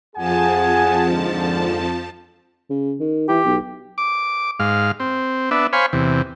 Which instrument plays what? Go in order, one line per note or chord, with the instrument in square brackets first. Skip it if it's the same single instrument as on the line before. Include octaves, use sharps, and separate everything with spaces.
[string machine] F2 F3 A5 [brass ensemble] G#4 F#5 G#5
[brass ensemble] G#2 D3
[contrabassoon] C#3
D#3
[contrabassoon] E3 [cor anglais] G4
[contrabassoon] B1
[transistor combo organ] D6
G#2 F5
C4
B3 D4 E5
C5 C#5 F5 G#5 B5
E2 C3